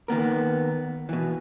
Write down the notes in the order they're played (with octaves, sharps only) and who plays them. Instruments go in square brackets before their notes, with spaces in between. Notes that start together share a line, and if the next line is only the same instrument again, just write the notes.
[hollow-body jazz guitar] D#3 A#3 B3 A#4
B2 E3